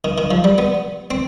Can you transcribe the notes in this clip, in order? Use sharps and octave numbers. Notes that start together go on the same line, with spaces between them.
D#3
D#3
F3
G3
B3
C4